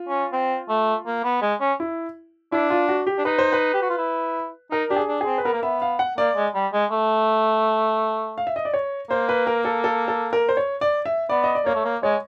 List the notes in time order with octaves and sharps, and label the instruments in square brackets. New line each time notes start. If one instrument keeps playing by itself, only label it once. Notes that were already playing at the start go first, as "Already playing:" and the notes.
Already playing: [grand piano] F4
[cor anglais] C#4
C4
A3
A#3
B3
G#3
C#4
[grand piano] E4
[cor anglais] D4 [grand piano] E4
[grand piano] F4
F#4
G4
[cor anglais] D4
[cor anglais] D#4 [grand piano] B4
[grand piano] C5
B4
[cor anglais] G4
F#4
F4
E4
[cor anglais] D#4 [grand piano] A#4
[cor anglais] D4 [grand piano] G4
[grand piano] G#4
[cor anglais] D4
[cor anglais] C4 [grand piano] G#4
[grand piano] B4
[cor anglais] B3 [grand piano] A#4
[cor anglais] A#3
[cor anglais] B3 [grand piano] E5
[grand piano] F5
F#5
[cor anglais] A#3 [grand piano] D5
[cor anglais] G#3
G3
G#3
A3
[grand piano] F5
E5
D#5
D5
C#5
[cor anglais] A#3 [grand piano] C5
[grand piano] B4
A#4
A4
A4
A4
A#4
C5
C#5
D5
E5
[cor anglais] B3 [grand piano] D5
[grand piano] D#5
D5
[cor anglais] A#3 [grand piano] C#5
[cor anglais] A3
A#3
[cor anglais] G#3 [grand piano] C#5